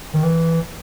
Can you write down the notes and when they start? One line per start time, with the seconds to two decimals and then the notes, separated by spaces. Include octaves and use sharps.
0.14 D#3
0.23 E3